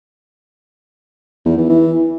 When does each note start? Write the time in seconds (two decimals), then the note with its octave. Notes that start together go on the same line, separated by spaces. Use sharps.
1.46 E2
1.58 E3
1.69 E3